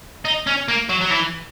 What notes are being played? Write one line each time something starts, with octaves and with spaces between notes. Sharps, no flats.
D#4
C#4
A#3
F#3
F#3
E3